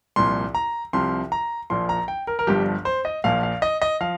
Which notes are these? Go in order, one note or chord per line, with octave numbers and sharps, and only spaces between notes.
C2 A#2 F3 C6
A#5
C2 C3 F3 C6
A#5
A#1 A#2 F3 C6
A#5
G5
A#4
A#4
G1 G2 F3 G4
C5
D#5
A#1 A#2 F3 F5
F5
D#5
D#5
F3 F5